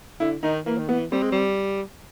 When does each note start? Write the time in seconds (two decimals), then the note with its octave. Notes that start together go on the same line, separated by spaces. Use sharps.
0.20 D3 E4
0.43 D#3 D#4
0.66 E3 A#3
0.78 D#3
0.89 E3 B3
1.12 G3 C4
1.22 G#3
1.32 G3